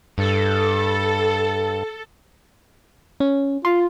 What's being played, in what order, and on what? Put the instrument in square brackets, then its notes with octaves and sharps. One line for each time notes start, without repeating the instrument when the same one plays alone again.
[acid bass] G2 [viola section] A4
[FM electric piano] C#4
[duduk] F4 [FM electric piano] C6